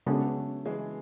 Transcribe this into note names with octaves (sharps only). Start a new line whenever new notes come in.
C#3 F#3 G#3 A3 B3 D4
E3 G#3